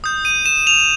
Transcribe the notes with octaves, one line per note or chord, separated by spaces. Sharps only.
D#6 G6
D#7
E7
F7